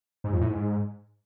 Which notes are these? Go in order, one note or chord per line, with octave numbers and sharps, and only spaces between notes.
G#2
F2
A2
G#2